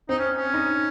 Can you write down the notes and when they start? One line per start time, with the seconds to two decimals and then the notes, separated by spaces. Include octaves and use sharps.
0.09 C4 D#4
0.19 C#4
0.37 C#4
0.54 D#4